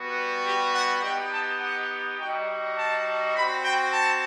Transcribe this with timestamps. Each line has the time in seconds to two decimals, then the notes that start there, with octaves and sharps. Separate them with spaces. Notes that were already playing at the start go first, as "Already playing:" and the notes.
Already playing: G3 B3 F#4
0.46 G4
0.74 F#5
1.03 B3 D#4 G4 G5
1.32 A5
1.61 F#5
2.19 G3 D#4 F#4 G5
2.77 A5
3.35 C4 B5
3.40 F#4
3.64 G5
3.93 A5